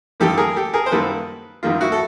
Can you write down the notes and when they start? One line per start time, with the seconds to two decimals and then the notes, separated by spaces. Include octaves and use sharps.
0.20 F#2 D#3 G3 A#3 G4 A4
0.37 G#4 A#4
0.56 G4 A4
0.73 G#4 A#4
0.86 C5
0.91 F#2 D#3 G3 A#3 A4 B4
1.63 F#2 D#3 G3 A#3 F4
1.81 E4 F#4
1.92 A4